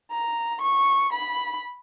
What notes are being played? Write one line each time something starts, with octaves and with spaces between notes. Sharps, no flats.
A#5
C#6
B5